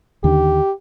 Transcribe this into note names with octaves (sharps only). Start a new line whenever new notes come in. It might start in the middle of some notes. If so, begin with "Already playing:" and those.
D#2 D3 D#3 G4